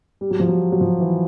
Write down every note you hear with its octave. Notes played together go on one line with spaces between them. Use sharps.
G3
F#3
F3
F#3
F#3
F3
E3